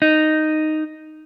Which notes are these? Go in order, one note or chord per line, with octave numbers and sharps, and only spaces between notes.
D#4